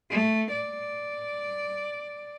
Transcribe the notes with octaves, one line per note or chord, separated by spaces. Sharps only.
A3
D5